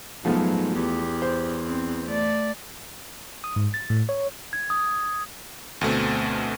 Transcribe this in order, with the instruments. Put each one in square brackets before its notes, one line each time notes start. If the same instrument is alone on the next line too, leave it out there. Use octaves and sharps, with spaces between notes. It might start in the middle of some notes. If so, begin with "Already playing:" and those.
[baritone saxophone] G#2 [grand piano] F3 A3 B3 [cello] F#3
[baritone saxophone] E2 [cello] G4
[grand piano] C5
[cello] C4
A3 D5
[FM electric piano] D#6
G#2
A6
A2
C#5
[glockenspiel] G#6
D#6
[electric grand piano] D2 B2 A3 C4